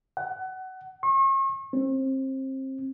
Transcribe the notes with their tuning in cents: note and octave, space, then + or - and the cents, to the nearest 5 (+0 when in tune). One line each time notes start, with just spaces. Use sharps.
F#5 +25
C#6 -40
C4 +25